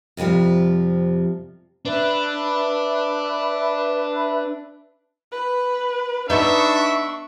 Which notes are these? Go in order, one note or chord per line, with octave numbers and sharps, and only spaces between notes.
F2 C3 D#3 F3 G3
D4 B4 E5
B4
B3 D4 D#4 E5 C#6